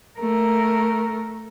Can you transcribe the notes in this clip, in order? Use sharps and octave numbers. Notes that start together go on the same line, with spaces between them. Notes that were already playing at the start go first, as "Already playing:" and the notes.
A3 A#4